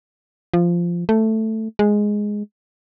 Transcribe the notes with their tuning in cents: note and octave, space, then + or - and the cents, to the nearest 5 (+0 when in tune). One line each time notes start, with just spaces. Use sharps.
F3 -10
A3 +5
G#3 +0